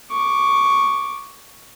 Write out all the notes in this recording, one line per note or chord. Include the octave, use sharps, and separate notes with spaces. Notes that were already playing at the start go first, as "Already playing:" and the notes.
C#6 D6